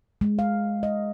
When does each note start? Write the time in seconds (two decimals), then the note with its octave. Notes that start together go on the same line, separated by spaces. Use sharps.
0.21 G#3
0.39 F5
0.83 D#5